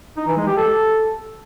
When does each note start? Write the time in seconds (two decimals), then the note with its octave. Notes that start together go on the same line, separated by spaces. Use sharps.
0.17 D#4
0.27 E3
0.37 G#3
0.47 G4
0.57 A4